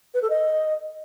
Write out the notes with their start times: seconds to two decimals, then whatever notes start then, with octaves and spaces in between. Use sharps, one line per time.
0.14 B4
0.22 A4
0.30 D#5